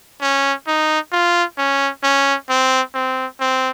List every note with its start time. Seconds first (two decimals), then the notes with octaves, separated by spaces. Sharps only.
0.22 C#4
0.67 D#4
1.12 F4
1.58 C#4
2.04 C#4
2.49 C4
2.94 C4
3.40 C4